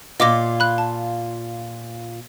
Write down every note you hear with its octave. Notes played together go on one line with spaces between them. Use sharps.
A#2 F4 D#5 D6 A#6
B5 F#6
A5